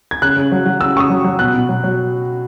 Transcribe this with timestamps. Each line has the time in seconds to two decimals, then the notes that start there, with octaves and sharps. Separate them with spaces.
0.11 G#6
0.22 C#3 F#6
0.36 C#3
0.52 F#3
0.66 F#3
0.81 C#3 E6
0.96 C#3 C#6
1.00 D#6
1.10 F#3
1.24 F#3
1.39 B2 F#6
1.54 B2
1.69 F#3
1.84 F#3